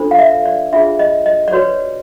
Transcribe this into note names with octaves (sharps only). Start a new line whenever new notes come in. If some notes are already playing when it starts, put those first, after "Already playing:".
Already playing: D4 F4 A4 C5
F5
E5
D5
D4 F4 G#4 E5
D#5
D#5
D5
F#4 B4 C#5